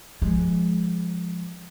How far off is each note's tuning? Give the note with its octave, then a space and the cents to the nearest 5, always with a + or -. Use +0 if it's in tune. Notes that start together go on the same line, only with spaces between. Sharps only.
F3 +0 G#3 +0